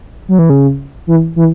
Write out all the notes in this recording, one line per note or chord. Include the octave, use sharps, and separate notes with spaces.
F#3
E3
C#3
E3
E3